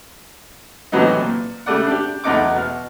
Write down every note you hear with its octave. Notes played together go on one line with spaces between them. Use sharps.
A2 C3 E3 F#3 B3 D#4
A#2
C#3 G3 A3 A4 D5 F#5
D4 G4
B1 E2 A3 D#4 F#5 D6
B2 F6